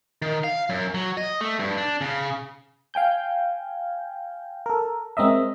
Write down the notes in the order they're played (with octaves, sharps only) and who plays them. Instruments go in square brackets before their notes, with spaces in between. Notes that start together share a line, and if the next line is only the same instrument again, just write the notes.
[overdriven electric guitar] D#3
F5
F#2
F#3
D#5
A3
G2
D4
C#3
[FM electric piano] F5 G5 G#5 G6
A4 A#4
G#3 C4 C#4 A#4 D#5 E5